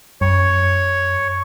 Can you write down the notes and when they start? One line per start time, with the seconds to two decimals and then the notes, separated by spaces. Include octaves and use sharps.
0.21 F#2 C#5